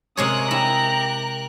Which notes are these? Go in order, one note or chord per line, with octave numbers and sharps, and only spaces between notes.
C3 G#3 C#4 A#4 C#5 D#6 F#6
E4 G4 A#5